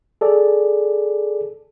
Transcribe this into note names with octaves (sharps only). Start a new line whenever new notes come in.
G#4 A4 D5